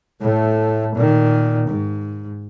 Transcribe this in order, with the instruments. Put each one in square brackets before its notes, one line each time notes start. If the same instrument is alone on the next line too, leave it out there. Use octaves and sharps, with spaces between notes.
[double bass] A2 A3
A#2 D#3
G#2